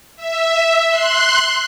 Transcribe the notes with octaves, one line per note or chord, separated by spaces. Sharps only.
E5
C6 F#6